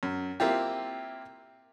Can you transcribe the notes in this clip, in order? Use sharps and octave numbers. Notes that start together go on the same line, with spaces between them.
F#2
A#3 C4 E4 F4 G4